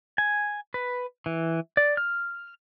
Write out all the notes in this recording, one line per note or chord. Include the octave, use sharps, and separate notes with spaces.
G#5
B4
E3
D5
F6